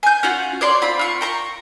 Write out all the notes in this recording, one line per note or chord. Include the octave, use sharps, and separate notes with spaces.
G#5 G6
C#4 F4 F#4
C#5 D5 C6 D6
C4 F4 B5
F4 C#6
G5 A#5 C#6